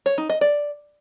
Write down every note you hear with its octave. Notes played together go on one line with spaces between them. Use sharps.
C#5
D#4
D#5
D5